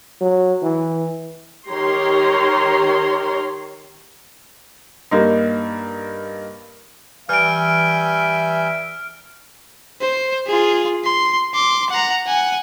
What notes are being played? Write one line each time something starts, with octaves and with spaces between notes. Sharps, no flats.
F#3
E3
D#3 G4 C#5 A#5 C6
G2 A#3 D#4
E3 G3 E5 G#5 F6 G6 D7
C5
F4 G#4
C6
C6 D6
F#5 A#5
F#5 G#5